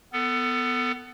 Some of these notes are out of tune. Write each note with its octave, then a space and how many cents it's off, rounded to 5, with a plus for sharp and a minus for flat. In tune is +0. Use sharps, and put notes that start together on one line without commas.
B3 +15 A4 +25